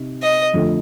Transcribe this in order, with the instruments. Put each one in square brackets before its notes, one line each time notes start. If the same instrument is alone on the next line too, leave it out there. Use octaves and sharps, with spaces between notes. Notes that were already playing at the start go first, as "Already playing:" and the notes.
Already playing: [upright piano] C3 D#4
[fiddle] D#5
[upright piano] F2 D3 A3